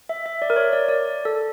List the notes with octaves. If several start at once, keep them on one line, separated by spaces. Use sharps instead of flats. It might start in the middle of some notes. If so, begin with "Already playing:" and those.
E5
E5
D5
A#4
C#5
D5
D5
A4